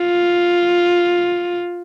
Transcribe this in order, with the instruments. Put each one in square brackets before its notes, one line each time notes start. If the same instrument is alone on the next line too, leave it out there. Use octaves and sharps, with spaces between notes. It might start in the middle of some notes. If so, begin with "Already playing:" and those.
Already playing: [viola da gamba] F4